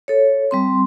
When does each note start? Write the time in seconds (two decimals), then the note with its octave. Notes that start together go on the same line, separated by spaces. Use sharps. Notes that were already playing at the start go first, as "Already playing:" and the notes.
0.08 A4 C#5
0.51 G3 C4 C6